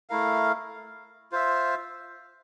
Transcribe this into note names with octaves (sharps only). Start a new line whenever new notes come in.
A3 E4 A#4 F5
F4 C5 E5